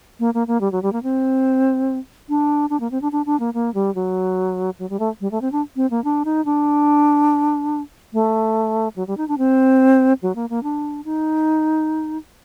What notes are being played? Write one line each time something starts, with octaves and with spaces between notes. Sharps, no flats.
A#3
A#3
A#3
G3
F#3
G3
A#3
C4
D4
D4
A#3
C4
D4
D4
D4
A#3
A#3
G3
F#3
F#3
G3
A3
G3
A3
C4
D4
C4
A#3
D4
D#4
D4
A3
F#3
G3
D#4
D4
C4
F#3
A#3
A#3
D4
D#4